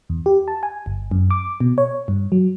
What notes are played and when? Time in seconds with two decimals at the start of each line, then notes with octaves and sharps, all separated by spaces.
0.10 E2
0.26 G4
0.48 A5
0.63 G#5
0.86 G1
1.11 F#2
1.31 D6
1.60 B2
1.78 C#5
2.08 G2
2.32 F#3